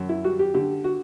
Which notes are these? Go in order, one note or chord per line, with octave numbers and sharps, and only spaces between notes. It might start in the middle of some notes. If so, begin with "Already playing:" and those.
Already playing: F#2
E4
G3 F#4
G4
D3 G4
F#4